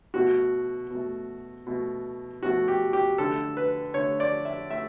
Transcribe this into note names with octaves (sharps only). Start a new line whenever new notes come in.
B2 A3 F#4
B2 A3
B2 A3
B2 A3 F#4
G4
G4
D3 A3 A4
B4
D3 A3 C#5
D5
E5
A3 E5